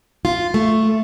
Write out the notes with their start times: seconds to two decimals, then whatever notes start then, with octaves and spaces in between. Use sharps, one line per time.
0.25 F4
0.54 A3